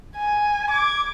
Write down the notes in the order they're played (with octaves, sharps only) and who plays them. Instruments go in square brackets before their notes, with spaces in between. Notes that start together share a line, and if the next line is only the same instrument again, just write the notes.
[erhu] G#5
[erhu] D6 [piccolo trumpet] G#6